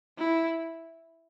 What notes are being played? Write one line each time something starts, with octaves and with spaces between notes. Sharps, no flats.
E4